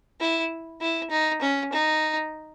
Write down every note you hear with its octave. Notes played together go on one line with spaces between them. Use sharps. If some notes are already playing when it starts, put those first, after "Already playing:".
E4
E4
D#4
C#4
D#4